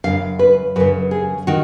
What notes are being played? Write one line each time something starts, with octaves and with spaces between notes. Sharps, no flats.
F#2 C#3 F5
B4
F#2 C#3 B4
G#4
D#3 F#4